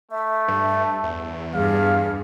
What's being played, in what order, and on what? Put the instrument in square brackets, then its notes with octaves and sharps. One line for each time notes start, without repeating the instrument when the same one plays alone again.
[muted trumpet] A3 [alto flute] E5
[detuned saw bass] G2
E2
[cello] G2 [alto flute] G#4 [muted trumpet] F5